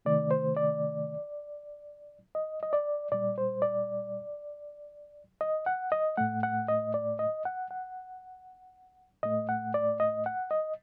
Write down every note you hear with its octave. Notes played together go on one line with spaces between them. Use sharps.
C3 D#3 A3 D5
C5
D5
D#5
D#5
D5
A#2 G3 D5
C5
D5
D#5
F#5
D#5
A2 A3 F#5
F#5
D#5
D5
D#5
F#5
F#5
A2 A3 D#5
F#5
D5
D#5
F#5
D#5